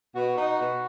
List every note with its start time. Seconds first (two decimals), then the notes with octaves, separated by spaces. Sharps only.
0.14 B2 F#4
0.37 D#4
0.59 B2